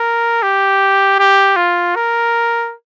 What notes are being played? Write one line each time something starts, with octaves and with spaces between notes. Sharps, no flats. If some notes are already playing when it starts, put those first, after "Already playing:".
Already playing: A#4
G4
G4
F4
A#4